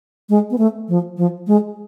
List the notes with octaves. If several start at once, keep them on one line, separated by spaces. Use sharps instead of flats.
G#3
B3
A3
F3
F3
G#3